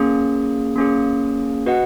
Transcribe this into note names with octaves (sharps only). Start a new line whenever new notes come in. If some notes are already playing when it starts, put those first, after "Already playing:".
Already playing: A#3 C#4 G#4
A#3 C#4 G#4
F#4 B4 D#5 F#5